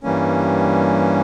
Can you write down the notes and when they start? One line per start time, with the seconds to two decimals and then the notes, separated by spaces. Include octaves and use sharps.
0.03 G2 E3 G3 A#3 C#4